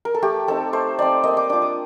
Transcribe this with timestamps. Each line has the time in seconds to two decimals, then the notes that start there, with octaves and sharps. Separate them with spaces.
0.05 A#4
0.15 A4
0.22 A3 G4
0.48 C4 D#4 A4
0.73 A3 C5
0.98 C4 D#4 D5
1.24 A#3 D#5
1.37 D6
1.49 D4 F4 D6
1.62 D#6